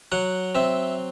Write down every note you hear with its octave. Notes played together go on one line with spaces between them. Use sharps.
F#3 F#5
C4 E5